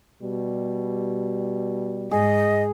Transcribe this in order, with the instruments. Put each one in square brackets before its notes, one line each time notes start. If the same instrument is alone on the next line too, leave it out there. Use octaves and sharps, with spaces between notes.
[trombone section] B2 G3
[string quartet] G#2 [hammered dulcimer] G#4 [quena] D#5